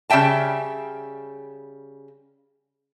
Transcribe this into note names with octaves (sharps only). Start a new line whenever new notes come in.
C#3 G3 E5 G5 A5